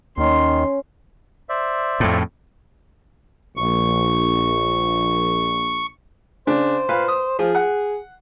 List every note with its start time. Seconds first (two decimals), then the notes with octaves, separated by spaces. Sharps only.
0.18 D#2 D#3 C#4 C6
1.49 C5 D5 E5
2.00 F2 A2
3.57 A#1 C#6
6.47 C#3 D4 C5
6.89 A#2 B4 F5
7.08 D#6
7.39 F3 F4 G#4
7.55 F#5